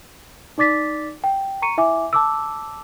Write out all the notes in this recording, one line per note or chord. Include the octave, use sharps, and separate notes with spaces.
D#4 D5 D6 A6 B6
G5
A#5 C#6 C#7 D#7
E4 E5 G#5 D6
A5 D6 E6